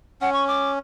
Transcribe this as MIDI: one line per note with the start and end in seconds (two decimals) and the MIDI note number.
0.21 0.79 61
0.21 0.32 78
0.33 0.44 85
0.48 0.71 86